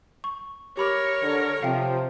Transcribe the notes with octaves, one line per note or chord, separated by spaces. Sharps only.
C#6
G4 A#4 C#5 B5 D6
D3
C3 F3 F5 G5